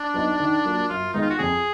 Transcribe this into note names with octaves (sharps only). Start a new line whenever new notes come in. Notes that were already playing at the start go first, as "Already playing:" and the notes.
Already playing: D4
F#3 B3 D#4 F#4
D#3
F#3 A#3 F4
F#2 F4
D#3 G#3 B3 D#4
F4
F#4
F2 G#4